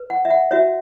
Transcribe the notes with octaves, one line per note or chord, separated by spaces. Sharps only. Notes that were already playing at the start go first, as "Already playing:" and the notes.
Already playing: B4
F#5
E5
F#5
F#4 C#5 E5